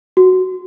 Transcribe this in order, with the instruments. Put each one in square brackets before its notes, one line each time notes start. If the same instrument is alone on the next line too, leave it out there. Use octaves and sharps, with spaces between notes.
[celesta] F#4